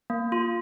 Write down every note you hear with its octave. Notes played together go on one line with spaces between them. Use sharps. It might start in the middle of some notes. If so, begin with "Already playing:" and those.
A#3
F4